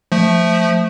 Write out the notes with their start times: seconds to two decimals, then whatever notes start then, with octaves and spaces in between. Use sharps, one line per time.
0.12 F3 A3